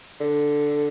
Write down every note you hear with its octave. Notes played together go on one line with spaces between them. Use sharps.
D3